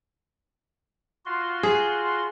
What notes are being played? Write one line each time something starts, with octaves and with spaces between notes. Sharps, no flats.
F4 F#4 C6
G#4